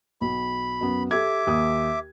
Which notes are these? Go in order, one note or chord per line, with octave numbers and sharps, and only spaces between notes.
B1 B5
F#2 B3
G4 A4 E5 D6 G#6
D#2 D#6